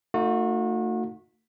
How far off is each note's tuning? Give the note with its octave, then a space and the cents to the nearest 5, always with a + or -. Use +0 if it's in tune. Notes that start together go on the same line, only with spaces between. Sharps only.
A3 +35 D#4 +0 F#4 -35